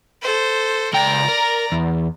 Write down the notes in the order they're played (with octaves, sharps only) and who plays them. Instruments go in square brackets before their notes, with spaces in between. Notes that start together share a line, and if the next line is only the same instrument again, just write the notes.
[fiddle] A4 C5
[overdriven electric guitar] C#2 G5 [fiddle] D5 A#5
[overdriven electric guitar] A#4
E2